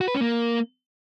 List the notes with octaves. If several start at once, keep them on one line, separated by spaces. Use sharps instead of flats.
F#4
B4
C#4
A#3